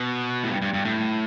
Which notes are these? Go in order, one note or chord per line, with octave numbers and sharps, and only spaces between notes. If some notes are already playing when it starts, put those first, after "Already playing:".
Already playing: B2
A2
G2
G2
G2
A2